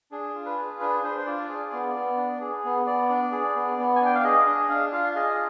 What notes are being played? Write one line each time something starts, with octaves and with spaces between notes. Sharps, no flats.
D4 G#4
F4
B4
G#4
D4 B4
D4 C5
C5
F4 D5
G#4
B3
B3
D4
G#4
B3
B3 D5
D4
G#4
B3
B3
G#5
D4 G5
F5
G#4 D#5
D4 D#5
D4 F5
F4 F5
G#4 D#5